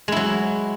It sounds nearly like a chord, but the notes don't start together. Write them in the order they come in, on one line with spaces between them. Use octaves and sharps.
G#3 E4 F#3